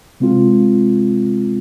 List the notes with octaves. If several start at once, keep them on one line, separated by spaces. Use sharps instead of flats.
C3 G#3 C4 F4